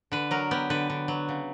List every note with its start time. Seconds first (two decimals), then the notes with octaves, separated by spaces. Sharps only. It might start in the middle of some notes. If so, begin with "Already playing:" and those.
0.12 D3 B4
0.31 F#3 A#4
0.51 B3 G4
0.70 D3 B4
0.90 D3
1.08 F#3
1.29 C#3